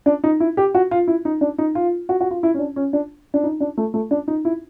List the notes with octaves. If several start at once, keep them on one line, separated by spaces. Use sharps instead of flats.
D4
D#4
E4
G4
F#4
F4
E4
D#4
D4
D#4
F4
F#4
F#4
F4
E4
C#4
D4
C#4
D4
D4
D#4
D4
A3
A3
D4
D#4
E4